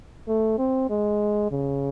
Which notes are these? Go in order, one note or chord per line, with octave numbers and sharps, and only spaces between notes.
A3
C4
G#3
C#3